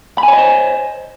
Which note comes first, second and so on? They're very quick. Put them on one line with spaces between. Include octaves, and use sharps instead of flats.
B5 G#5 C#5 D#5 C5